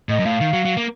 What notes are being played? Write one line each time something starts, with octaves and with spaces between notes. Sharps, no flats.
A2 D#5
F#2
A2 F5
D#3
F#3
F#3
A#3